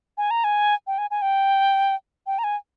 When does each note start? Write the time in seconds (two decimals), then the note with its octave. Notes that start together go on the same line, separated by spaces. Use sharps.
0.18 G#5
0.31 A#5
0.44 G#5
0.87 G5
0.98 G#5
1.11 G#5
1.22 G5
2.27 G5
2.39 A#5
2.44 G#5